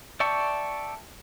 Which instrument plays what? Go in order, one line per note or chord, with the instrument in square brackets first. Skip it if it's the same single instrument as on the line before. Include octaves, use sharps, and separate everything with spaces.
[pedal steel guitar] D5 E5 G5 A5 C#6